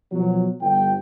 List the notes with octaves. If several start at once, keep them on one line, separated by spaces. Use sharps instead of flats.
B2 F3 F#3
G1 G5